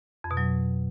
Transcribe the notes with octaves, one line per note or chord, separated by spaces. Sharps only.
F2
B2
F#3